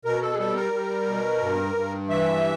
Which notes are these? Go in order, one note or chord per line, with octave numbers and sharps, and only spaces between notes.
B2 A#4
A4
G#4
G3 A4
A#4
G3
B2
G2
G2
E3 E5